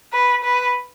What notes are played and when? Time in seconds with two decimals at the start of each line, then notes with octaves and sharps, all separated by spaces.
0.13 B4
0.44 B4